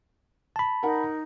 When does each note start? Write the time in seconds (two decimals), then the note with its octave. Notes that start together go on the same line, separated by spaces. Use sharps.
0.56 A5 B5
0.83 D#4 A#4 F#5